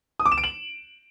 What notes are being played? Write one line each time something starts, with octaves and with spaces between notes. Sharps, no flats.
D#6
D6
E7
D7
F#7